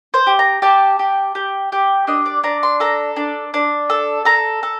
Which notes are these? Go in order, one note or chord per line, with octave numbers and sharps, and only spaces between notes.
C5
G4
A#5
G4 A5
G4
G4
G4
D4 D#5
D5
D4 A#5
C6
A4 A#5
D4
D4
A4
A4 A#5
A4